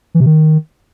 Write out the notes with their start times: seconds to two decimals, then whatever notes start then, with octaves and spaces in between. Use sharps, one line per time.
0.15 E3
0.20 C3
0.26 D#3